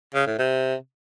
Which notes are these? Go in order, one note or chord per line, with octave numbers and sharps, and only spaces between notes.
C#3
A2
C3